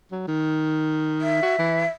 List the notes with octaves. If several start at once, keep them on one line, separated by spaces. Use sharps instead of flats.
F#3
D#3
E5
F#4
E3